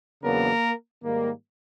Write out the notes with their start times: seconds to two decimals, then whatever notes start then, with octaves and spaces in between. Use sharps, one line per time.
0.22 E2 C#3 F#3 A#3 B3 D4 A#4
1.03 G#2 D#3 G3 A#3